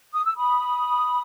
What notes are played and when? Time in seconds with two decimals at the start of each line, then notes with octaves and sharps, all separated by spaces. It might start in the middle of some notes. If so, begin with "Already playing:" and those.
0.13 D#6
0.25 E6
0.36 B5 D#6